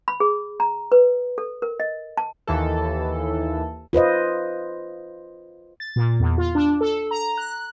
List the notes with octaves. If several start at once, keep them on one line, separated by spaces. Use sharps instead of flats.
B5
G#4
A#5
B4
A4
A#4
D#5
A5
D#2 E3 A4
F4 B4 C5 D#5
A6
A#2
E2
F4
D4
A4
A#5
F#6